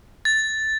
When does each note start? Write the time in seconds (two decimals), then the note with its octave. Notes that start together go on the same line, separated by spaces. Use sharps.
0.25 A6